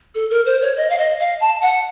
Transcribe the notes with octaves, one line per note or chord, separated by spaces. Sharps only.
A4
A#4
C5
C#5
D#5
F5
D#5
F5
A5
F#5